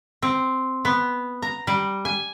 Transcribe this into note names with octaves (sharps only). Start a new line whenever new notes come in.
C4
B3
A#5
G3
G#5